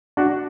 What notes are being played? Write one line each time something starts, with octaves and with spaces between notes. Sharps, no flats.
D4 F#4